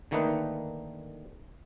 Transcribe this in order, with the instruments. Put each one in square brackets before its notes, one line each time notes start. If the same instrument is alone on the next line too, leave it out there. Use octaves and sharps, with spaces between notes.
[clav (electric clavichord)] D3 D#3 A3 A#3 D#4 B4